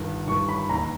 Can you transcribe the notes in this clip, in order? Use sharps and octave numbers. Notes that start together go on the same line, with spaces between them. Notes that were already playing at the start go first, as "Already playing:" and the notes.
Already playing: G1 G2 D#3
G1 G2 D#3 C#6
B5
E1 D#2 D#3 A#5